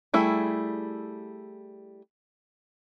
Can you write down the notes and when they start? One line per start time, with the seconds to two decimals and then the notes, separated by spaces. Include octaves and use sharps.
0.14 G3 A3 E4 G#4